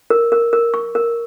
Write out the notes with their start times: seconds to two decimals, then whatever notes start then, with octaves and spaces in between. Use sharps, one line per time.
0.10 A#4
0.32 A#4
0.53 A#4
0.74 C#6
0.95 A#4